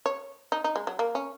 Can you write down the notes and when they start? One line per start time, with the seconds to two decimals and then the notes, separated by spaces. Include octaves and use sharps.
0.06 C#5
0.52 D#4
0.64 D#4
0.76 G#3
0.87 F#3
0.99 A#3
1.15 C#4